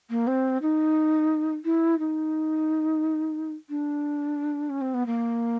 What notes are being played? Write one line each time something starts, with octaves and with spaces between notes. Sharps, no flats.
A#3
C4
D#4
E4
D#4
D4
C#4
C4
B3
A#3